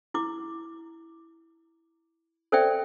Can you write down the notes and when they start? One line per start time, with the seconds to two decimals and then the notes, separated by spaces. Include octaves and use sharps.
0.14 E4 D6
2.52 A4 C5 D5 E5 G5